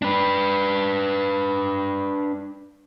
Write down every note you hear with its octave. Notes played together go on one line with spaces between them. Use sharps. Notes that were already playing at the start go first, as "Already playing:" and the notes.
D4 B4